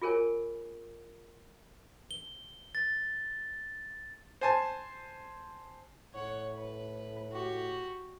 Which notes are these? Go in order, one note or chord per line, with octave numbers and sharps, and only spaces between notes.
F4 G#4 A#4 C#5 G#5
G7
A6
C5 G#5 A5
A2 C#5 F#5
B4
F#4 G4